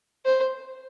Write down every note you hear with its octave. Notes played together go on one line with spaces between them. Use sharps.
C5